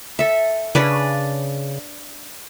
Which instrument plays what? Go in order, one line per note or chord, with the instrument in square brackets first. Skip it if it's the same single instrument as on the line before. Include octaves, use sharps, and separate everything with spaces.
[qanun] A4 E5
[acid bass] C#3 [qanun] D4 B4 D5